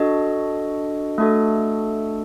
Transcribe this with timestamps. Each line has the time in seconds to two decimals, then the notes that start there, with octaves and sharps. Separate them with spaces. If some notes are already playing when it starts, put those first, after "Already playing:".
Already playing: D4 F#4 A4 D#5
1.18 A3 D4 F#4 A4